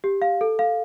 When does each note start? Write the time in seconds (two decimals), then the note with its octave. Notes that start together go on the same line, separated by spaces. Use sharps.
0.04 G4
0.22 F5
0.41 A4
0.59 F5